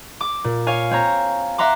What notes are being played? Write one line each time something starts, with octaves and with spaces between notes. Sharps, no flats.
D6
A#2
C#5 F5 G#5
C4 C#5 A#5
E5 F#5 A#5 C6 D6